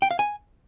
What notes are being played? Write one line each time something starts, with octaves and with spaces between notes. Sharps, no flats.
G5
F5
G#5